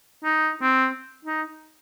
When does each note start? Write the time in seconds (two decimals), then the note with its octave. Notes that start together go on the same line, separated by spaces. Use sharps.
0.24 D#4
0.62 C4
1.25 D#4